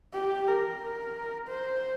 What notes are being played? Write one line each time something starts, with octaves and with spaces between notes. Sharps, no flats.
G4
A#4
C5